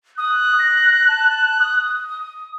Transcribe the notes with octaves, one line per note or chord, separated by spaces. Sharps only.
D#6 F#6
A#6
A5
D#6